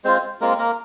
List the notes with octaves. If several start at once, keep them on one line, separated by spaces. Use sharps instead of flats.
G#3 C4 F4 C5
G#3 A#3 C4 F4 A#4
A#3 A#4